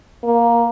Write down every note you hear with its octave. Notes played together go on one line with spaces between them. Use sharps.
A#3